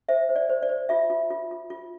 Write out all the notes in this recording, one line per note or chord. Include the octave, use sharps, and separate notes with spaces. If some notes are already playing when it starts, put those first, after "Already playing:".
C5 E5
C5
D5
C5
D5
C5
F4 E5
F4
F4
F4
F4